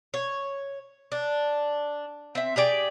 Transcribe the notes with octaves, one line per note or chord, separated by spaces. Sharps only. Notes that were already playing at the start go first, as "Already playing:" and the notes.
C#5
D4
C4 E5
G4 G#4 D5 G5